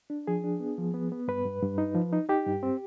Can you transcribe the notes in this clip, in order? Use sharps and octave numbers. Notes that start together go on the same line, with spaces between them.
D4
F3 G#4
D4
B3
F3
B3
B3
G2 B4
G2
G2
D#4
F3
D#4
D#4 G4
G2
C4